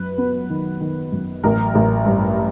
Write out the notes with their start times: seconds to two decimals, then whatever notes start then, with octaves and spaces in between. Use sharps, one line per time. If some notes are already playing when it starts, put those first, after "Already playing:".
Already playing: F#2 B4
0.18 B3
0.50 D#3
0.81 D#3
1.12 F#2
1.44 A1 A#4
1.75 A1
2.06 G2